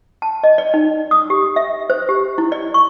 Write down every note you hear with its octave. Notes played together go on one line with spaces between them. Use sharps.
A5
D#5
D5
D#4
D#6
G4
E5
C5
G4
E4
D5
C#6